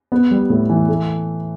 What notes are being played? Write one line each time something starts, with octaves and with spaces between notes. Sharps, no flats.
B3
G3
A2
E3
A3